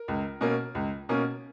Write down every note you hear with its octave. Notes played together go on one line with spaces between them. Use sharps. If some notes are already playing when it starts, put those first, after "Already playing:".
Already playing: A#4
C#2
B2 A#3 C#4
C#2
B2 A#3 C#4